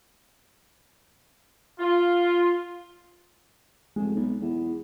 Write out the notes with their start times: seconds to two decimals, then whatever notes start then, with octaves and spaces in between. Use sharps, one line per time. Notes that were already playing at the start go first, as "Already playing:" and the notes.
1.79 F4
3.96 F1 G#3
4.15 B1
4.41 E2